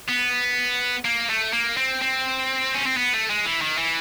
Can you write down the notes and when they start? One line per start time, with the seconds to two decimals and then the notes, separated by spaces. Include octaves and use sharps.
0.09 B3
1.05 A#3
1.30 A3
1.53 A#3
1.77 C4
2.01 C4
2.75 C#4
2.86 C4
2.97 B3
3.14 A3
3.30 G#3
3.45 E3
3.62 D#3
3.78 E3